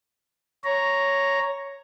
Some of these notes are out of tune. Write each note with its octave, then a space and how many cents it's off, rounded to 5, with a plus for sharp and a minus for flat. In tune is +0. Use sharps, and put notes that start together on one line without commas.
C#5 +0 A#5 +0